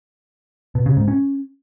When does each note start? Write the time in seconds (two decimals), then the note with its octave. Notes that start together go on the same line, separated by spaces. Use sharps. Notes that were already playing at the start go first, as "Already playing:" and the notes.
0.75 B2
0.86 C#3
0.97 G#2
1.08 C#4